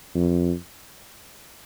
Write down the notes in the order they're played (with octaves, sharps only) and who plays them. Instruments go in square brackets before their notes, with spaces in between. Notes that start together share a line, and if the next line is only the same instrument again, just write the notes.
[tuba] F2